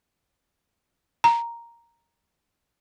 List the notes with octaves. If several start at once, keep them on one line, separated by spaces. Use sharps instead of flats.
A#5